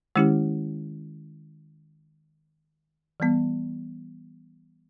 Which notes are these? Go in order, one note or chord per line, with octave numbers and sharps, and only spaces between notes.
D#3 G#3 C#4 E4 G4
E3 G3 B3